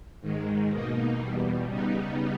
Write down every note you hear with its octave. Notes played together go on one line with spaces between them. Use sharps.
G#2 D#3 G#3
B2 A#3 D#4
E2 B2 G3
C#3 G3 B3 D#4